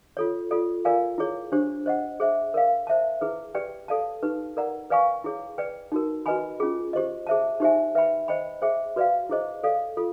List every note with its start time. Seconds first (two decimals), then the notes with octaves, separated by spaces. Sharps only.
0.17 F4 A4 C#5
0.51 F4 A4 D5
0.85 F4 A#4 D5 F5 G#5
1.18 E4 G#4 C#5
1.52 D4 G4 C5
1.86 C5 D#5 F#5
2.20 G#4 C5 E5
2.54 A#4 D5 F5
2.87 C5 E5 A5
3.21 E4 G#4 B4
3.55 G4 B4 D5 G5
3.88 A4 D5 F5 A5
4.23 D#4 G4 B4
4.57 A#4 D5 F#5 A#5
4.90 B4 D5 F5 G#5 C#6
5.24 E4 G#4 C#5
5.58 B4 D5 G5
5.92 D#4 F#4 A#4
6.26 F#4 B4 D#5 G#5 B5
6.60 C#4 F4 G#4
6.93 G4 C5 D#5
7.27 G#4 C5 E5 A5
7.60 D#4 G4 C5 E5 G#5
7.95 B4 E5 G5 B5
8.28 C5 D#5 G5 B5
8.62 G#4 C5 E5 G5
8.96 F#4 B4 D5 F5
9.29 E4 G#4 C5 D#5
9.63 A4 D5 F5
9.97 F4 A4